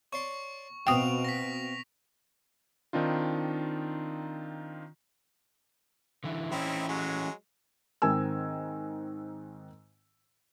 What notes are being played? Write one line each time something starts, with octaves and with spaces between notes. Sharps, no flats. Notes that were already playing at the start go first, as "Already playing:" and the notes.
C#5 D5 C6 C#6
B2 C4 F#4 F5 G5 D#6 D7 F7
A#6 B6
D#3 C4 D4 D#4 F4
D3 E3 E4
E3 C4 C#4 D#4 E4
F#3 G#3
G#2 D#3 C4 A#4 G#5 E6